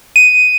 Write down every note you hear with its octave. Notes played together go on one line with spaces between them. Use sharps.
D#7